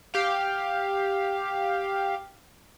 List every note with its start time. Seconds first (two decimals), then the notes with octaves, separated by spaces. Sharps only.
0.14 G4 F5